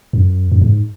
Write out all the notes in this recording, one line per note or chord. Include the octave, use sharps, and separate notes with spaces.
F#2
F#2
G#2